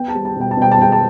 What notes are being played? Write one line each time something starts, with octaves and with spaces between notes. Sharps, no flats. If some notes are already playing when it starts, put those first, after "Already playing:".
Already playing: B3 G5
A5
G3
A5
B2 G5
A5
B2 G5
A5
B2 G5
A5